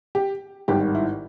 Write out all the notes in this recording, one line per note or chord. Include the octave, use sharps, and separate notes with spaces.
G4
G#1 G2 D#3 G4
E4